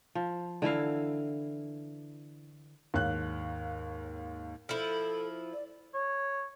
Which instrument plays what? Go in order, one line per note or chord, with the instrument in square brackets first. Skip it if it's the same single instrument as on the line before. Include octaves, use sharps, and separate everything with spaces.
[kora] F3
D3 E3 E4 F5
[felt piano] D#2 G#2 C#5 F5 F#6
[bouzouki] F3 E4 [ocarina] A4
[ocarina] D5
[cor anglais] C#5